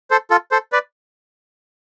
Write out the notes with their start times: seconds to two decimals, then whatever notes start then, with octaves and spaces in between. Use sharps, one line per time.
0.11 A4 C5
0.30 F4 A4
0.51 A4 C5
0.72 B4 D5